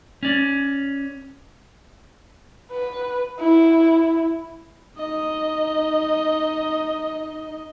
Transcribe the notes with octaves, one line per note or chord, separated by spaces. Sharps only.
C#4 D5
B4
E4
D#4 D#5